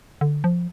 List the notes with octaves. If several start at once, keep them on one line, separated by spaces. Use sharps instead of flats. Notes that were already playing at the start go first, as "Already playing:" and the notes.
D3
F3